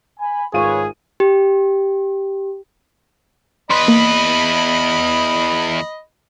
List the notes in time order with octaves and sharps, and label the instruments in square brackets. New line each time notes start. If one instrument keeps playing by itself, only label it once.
[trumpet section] G#5 B5
[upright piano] G#1 F4 D#7 [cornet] G#4 [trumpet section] B4 C#5
[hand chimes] G4
[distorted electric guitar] E2 B4 [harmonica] D#5 B5 [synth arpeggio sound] C6
[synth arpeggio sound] A#3